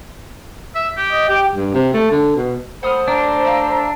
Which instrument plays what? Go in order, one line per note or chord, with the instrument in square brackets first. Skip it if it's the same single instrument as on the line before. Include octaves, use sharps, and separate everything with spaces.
[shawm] E5
G4
[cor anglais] D#5
[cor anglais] G4 [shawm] G5
[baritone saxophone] G2
C3
A3
D3
B2
[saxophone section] A3 A4 C5 [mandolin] F#5 D#6 F6 [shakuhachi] B5
[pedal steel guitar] D4 [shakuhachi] A#5
[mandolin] E5 F5